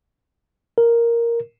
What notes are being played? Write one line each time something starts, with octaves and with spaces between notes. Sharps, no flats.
A#4